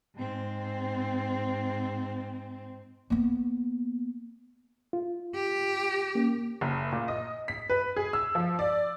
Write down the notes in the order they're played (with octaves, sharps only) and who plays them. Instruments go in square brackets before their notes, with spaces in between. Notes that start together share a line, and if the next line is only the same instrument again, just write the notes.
[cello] G#2 C4
[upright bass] A#3 B3
[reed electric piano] F4
[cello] G4
[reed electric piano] A#3 C#4
[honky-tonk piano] F#1
A#2
D#5
B6
B4
G#4
E6
F3
D5